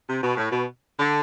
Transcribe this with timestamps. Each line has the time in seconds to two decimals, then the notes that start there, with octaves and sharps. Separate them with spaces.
0.08 C3
0.22 B2
0.37 A2
0.50 B2
0.99 D3